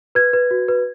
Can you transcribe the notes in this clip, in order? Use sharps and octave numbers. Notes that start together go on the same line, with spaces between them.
B4 G#6
B4
F#4
B4